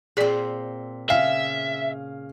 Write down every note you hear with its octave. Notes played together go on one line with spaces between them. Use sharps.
A#2 C4 G#4 D5
C#3 E5 F5